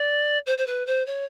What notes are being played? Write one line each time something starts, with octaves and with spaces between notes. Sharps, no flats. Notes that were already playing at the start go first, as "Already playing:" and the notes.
Already playing: D5
C5
C5
B4
C5
C#5